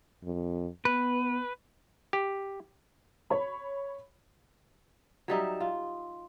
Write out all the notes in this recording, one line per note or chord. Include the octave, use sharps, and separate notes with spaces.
F2
B3 B4
G4
C#5 B5
F#3 G3 D#4 E5
F4